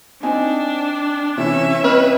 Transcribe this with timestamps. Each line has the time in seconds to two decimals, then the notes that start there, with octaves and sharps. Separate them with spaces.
0.23 C4 D4 D#4 G#5
1.37 C3 E3 C#4 E5
1.84 C4 B4 D#5 F6